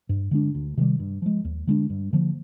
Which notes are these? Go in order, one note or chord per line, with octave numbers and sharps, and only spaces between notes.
G2
D3 G#3 D4
D2
C3 D#3 G3
G2
F3 G#3
D#2
D3 G#3 D4
G2
D3 F3 A#3